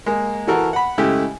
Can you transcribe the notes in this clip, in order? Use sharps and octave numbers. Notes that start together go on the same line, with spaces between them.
G#3 A#3
E3 F#4 A4 A#4
F#5 B5
C#3 G#3 A3 E4 G4